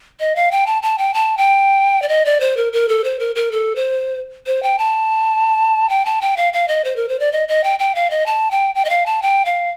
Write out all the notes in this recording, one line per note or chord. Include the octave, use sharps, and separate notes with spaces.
D#5
F5
G5
A5
A5
G5
A5
G5
D5
D#5
D5
C5
A#4
A#4
A4
C5
A#4
A#4
A4
C5
C5
G5
A5
G5
A5
G5
F5
F5
D#5
C5
A#4
C5
D5
D#5
D#5
G5
G5
F5
D#5
A5
G5
G5
D#5
F5
A5
G5
F5